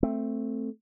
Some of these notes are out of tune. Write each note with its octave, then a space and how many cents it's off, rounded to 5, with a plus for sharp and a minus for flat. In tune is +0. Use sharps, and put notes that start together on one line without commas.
A3 +10 C4 +0